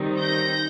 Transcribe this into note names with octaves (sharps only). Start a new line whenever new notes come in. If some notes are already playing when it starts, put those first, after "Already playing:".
Already playing: D#3 G3 C4 D#4
G6 A#6